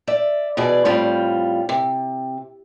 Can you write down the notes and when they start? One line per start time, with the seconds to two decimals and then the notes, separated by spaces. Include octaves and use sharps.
0.07 D5 E5
0.57 B2 E3 G#4 D5
0.85 A2 G3 C4 F4
1.69 C3